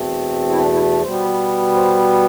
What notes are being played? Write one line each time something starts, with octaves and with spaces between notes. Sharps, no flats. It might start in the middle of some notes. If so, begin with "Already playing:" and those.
Already playing: E2 B2 A3 C4
E4
D4
C4
E4
D4
D4
B2 G3 B3 C5
C5